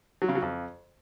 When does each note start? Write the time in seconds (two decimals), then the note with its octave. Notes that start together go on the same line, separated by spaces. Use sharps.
0.22 F#3
0.29 C#3
0.35 F#3
0.42 F2